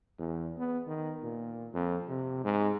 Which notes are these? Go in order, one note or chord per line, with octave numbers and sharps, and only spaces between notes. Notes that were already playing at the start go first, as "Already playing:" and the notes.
E2
B3
D#3
A#2
F2
C3
G#2